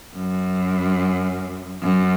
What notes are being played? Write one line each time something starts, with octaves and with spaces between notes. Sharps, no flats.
F#2
F#2